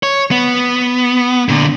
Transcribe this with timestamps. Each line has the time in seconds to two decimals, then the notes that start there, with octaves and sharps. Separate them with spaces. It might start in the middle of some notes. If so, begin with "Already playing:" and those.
0.03 C#5
0.31 B3
1.49 A#2 D3